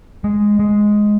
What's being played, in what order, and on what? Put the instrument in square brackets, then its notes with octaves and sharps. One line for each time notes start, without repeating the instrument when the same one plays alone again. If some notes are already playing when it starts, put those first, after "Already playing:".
[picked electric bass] G#3
G#3